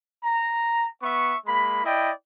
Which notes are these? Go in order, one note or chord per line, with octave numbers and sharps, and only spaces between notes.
A#5
B3 E5 C#6
G#3 A#3 B5
E4 D5 D#5 G5